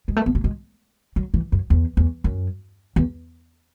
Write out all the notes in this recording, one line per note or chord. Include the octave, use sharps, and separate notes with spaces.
G#3
A3
B3
A3
G#3
F#3
E3
F#2
E2
E2
F#2
E2